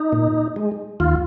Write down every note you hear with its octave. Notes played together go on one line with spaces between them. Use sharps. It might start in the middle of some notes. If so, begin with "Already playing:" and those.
Already playing: D#4
A#2
G#3
D#2 F4